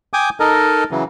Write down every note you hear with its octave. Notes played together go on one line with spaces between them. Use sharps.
G5 G#5 D6 D#6
D#4 A4 A#4 D#5
C#3 E3 F#3